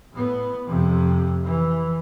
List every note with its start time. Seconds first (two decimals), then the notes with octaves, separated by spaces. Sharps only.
0.12 A2 B3
0.67 F2 C3
1.44 E3